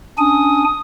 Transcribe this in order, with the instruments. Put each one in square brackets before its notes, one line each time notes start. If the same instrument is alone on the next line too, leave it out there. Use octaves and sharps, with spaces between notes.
[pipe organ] C#4 D4 G#5 [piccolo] D#6